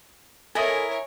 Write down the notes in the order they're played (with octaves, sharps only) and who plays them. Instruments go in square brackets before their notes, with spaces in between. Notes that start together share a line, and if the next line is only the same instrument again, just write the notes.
[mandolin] E4 A#5 [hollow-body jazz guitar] A4 D#5 [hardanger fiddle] A#4 C#5 [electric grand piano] G#5 D#6